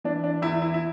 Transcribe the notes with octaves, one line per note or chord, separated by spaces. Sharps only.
E3 D4
D4
E2 E4
E4
E4